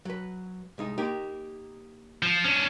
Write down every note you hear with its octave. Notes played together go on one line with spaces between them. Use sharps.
F#3 B4
C2 G#3 D#4
A#3 D#4 G4
F3
C#4 D4